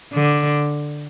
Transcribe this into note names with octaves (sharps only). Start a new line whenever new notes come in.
D3